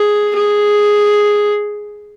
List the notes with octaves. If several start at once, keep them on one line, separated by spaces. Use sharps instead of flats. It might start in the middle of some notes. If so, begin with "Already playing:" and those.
Already playing: G#4
G#4